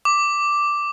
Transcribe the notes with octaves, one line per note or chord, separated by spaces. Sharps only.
D6